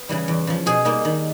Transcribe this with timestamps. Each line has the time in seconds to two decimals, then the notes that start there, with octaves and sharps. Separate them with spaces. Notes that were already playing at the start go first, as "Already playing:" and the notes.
Already playing: B3
0.09 C#3 E3 G3
0.28 E2
0.47 C#3 F3
0.66 B2 G#4
0.85 G3 A#3 D#4
1.05 D#3